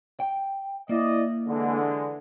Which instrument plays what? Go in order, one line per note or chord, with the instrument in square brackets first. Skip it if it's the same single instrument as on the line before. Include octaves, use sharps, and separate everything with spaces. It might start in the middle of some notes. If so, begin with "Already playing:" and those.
[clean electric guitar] G5
[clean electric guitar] A#3 [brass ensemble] E4 D5 D#5
[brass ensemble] D3 E3 G#3